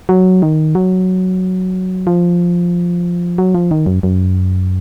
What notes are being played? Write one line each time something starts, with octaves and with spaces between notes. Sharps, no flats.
F#3
D#3
F#3
F3
F#3
F3
D#3
F#2
F#2